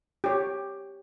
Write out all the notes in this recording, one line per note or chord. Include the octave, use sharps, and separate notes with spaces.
G4 C#5